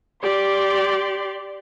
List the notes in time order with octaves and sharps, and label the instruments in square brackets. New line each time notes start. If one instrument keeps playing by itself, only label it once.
[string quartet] G4 D5 C6